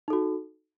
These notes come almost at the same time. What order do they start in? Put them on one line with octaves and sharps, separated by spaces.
D#4 A4 F#4